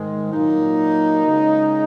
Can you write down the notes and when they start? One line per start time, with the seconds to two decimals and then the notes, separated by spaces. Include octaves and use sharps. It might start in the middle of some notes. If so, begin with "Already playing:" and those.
Already playing: G#2 D#3 G#3
0.32 A#2 F#3 A#3 D#4
1.26 C#3 G#3